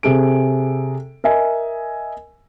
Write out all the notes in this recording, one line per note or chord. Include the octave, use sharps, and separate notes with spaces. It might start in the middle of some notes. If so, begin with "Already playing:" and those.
C3 G#4 A4 D7
A#4 D#5 E5 G#5